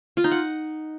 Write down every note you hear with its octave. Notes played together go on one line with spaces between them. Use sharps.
F4
D#4
F#5